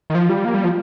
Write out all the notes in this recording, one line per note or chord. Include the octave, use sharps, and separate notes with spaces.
D#3
F3
G3
A#3
G3
F3